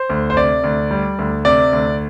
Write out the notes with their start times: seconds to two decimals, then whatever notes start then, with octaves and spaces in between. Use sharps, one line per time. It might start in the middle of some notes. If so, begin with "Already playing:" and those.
Already playing: C5
0.10 D2
0.30 C5
0.37 C3 D5
0.64 D2
0.91 G3
1.19 D2
1.45 C3 D5
1.72 D2